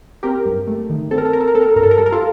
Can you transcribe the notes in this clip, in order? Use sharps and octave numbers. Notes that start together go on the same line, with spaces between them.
C4 G4 A#4
G2
A3
D#3
C4 A4
A#4
A4
C4 A#4
A4
A#4
C4 A4
A#4
A4
G2 A#4
A4
A#4
G3 A4
A#4
F4 A4